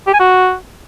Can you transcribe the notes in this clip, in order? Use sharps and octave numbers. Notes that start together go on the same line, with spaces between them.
G4
G#5
F#4